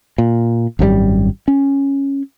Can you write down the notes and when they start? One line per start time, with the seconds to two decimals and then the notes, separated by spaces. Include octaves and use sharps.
0.18 A#2
0.79 G#1 F#2 A#2 G3
1.48 C#4